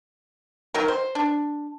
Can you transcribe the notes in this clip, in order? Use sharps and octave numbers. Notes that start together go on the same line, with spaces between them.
D#3 F#3 A#4
C5
D4